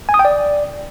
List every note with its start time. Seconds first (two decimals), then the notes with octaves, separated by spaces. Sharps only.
0.09 G#5
0.14 D#6
0.19 G5
0.25 D5